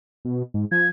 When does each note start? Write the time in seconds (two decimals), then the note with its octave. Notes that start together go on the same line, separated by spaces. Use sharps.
0.25 B2
0.54 G#2
0.71 F3 G#6